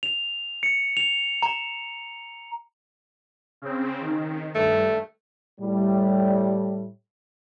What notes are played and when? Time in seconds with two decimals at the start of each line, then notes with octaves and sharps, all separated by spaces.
0.03 F7
0.63 C#7
0.97 F7
1.42 A#5
3.62 C#3 C4
4.01 D#3
4.55 G2 A3
5.60 A2 G3